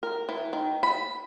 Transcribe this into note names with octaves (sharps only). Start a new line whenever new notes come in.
A#4
E3
D#3
B5